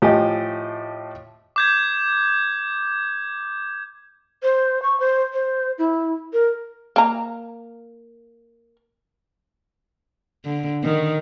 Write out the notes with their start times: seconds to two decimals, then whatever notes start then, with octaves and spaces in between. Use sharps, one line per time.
0.02 A2 F3 G4 D#5 G#5
1.56 D6 G6 G#6
4.42 C5
4.83 C#6
5.00 C5
5.33 C5
5.78 E4
6.33 A#4
6.96 A#3 A#5
10.45 D3
10.84 D#3